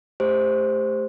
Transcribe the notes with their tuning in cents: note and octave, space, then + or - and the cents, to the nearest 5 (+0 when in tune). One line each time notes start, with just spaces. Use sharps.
A3 -15 G4 +25 C5 +0